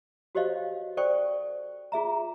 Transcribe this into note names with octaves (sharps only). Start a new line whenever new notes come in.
F#4 G4 C5 C#5 D#5 F5
A4 C5 D5 G5 C#6
F4 G#4 E5 A#5